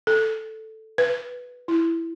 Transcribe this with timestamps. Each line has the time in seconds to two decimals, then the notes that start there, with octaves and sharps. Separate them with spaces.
0.07 A4
0.98 B4
1.68 E4